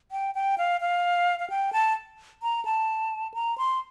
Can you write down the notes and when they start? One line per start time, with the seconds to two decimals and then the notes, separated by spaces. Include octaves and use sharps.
0.12 G5
0.35 G5
0.58 F5
0.81 F5
1.40 F5
1.50 G5
1.73 A5
2.43 A#5
2.65 A5
3.34 A#5
3.58 C6